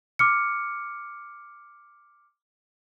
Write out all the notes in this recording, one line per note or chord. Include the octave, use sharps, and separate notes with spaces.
D6 F6 C#7